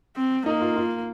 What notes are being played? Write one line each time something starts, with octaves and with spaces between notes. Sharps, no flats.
C4
A#3 D#4
F4
F4